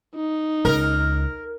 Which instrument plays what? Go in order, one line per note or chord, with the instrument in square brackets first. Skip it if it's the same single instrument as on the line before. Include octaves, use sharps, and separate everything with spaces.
[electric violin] D#4
[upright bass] C#2 [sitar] A#4